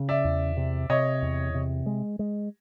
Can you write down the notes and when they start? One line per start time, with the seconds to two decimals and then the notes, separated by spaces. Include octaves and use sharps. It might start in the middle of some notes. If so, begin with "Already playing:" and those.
Already playing: C#3
0.09 D5 E5
0.25 E2
0.57 C3
0.89 C3 C#5 D#5
1.22 E2
1.54 C3
1.86 G#3
2.19 G#3